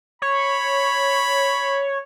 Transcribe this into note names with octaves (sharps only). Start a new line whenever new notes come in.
C#5 B5